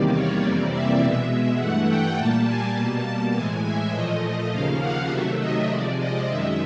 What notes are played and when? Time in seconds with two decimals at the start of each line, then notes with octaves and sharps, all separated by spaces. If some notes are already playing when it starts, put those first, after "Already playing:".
Already playing: E2 C3 D#3 G3 A#3 D5
0.12 C#5
0.42 F2 C3 E3 G3 A#3 D5
0.71 E5
1.01 B2 G#3
1.59 G2 E3 A3 F#5
1.88 G5
2.18 A#2 G3 A#3 A5
2.47 G#5
2.76 B2 G3 A#3 A5
3.05 A5
3.34 A2 E3 G#3 G#5
3.64 E5
3.93 A#2 F3 A3 D#5
4.51 D#2 C#3 F3 A#3 F5
4.81 F#5
5.10 C3 D#3 F#3 A3 E5
5.40 D#5
5.69 C3 F3 G#3 D5
5.99 D#5
6.28 F#2 D#3 G#3 E5